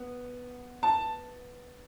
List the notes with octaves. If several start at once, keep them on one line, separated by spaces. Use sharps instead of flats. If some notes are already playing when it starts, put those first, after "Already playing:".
Already playing: B3
A5